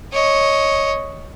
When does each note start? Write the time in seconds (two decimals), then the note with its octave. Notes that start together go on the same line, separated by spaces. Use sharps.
0.13 C#5 D#5